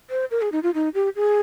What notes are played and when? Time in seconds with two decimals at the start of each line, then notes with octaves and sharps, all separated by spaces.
0.10 C5
0.31 A#4
0.42 G#4
0.52 D#4
0.63 F4
0.74 D#4
0.94 G4
1.16 G#4